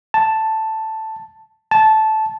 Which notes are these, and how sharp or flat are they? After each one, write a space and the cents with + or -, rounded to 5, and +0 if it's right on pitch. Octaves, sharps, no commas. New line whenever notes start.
A5 +5
A5 -10